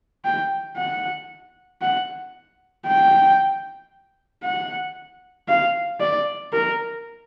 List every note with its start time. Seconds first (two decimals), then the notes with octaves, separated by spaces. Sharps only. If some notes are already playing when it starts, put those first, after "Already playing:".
0.25 G5
0.77 F#5
1.82 F#5
2.86 G5
4.44 F#5
5.48 F5
6.01 D5
6.53 A#4